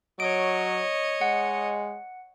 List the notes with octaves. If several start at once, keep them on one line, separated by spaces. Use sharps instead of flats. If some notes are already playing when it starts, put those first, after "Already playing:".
F#3 C#5 D#5 D7
G#3 F#5